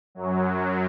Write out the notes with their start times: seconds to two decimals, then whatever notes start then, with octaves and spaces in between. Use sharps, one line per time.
0.15 F#2 F#3
0.44 F#2 F#3